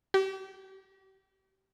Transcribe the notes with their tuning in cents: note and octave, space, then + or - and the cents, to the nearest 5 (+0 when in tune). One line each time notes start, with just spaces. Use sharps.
G4 -40